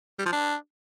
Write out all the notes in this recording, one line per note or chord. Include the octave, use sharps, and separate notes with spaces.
G3
F3
D4